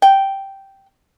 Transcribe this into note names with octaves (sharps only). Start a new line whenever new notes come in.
G5